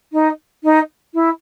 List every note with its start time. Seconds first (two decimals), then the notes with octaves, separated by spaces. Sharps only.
0.12 D#4
0.64 D#4
1.14 E4